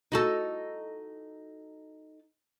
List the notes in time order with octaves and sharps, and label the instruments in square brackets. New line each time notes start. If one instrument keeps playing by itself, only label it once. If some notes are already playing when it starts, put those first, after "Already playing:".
[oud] D#4 F#4 A4